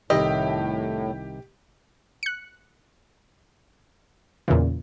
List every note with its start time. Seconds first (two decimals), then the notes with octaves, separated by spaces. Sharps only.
0.10 C2 A2 D#3 E4 G4 D#5
2.23 F#6 C#7
4.48 E2 A#2 C#3 E3